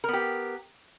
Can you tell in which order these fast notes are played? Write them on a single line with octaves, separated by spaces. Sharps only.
A#4 B3 G4